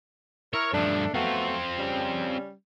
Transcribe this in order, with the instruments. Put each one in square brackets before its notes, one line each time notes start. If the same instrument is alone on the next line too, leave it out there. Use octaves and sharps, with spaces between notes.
[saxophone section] E4 A#4 [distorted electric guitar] C#5
[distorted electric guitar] G2 F3 [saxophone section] A3 D4 A4
[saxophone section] F#3 A3 B3 [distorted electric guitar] C4 F4
[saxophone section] C#3 G3 C#4